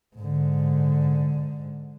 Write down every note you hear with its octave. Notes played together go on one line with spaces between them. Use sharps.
G#2 D3